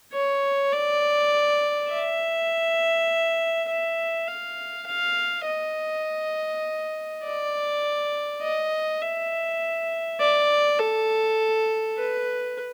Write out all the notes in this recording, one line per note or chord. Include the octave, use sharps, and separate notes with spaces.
C#5
D5
E5
E5
F5
F5
D#5
D5
D#5
E5
D5
A4
B4